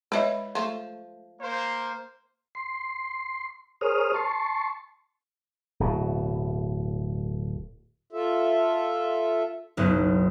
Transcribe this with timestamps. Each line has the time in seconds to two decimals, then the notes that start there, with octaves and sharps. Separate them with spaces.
0.12 G#3 E4 B4 C#5 D#5
0.55 F3 A3
1.41 A#3 C5
2.55 C6
3.81 G#4 A#4 C5 C#5 D#6 F6
4.14 A5 C6 C#6
5.80 D1 B2
8.13 F4 A4 E5
9.77 F#1 B1